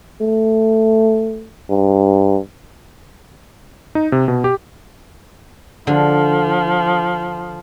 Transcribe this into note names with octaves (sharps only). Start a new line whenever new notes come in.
A3
G2
D#4
C3
B2
G4
D3 F3